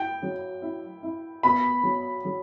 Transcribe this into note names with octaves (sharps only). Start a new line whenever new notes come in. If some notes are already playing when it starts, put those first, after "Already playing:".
Already playing: E4 G5
F#3
E4
E4
B3 B5
F#3
F#3